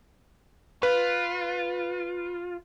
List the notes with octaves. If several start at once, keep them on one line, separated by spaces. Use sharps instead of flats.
F4 B4